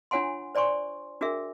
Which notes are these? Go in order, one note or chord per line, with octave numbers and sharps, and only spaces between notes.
D4 F4 C#5 F#5 G#5 C6
C5 D5 G#5 C6 C#6
D4 F#4 G#4 A#4 E5 G5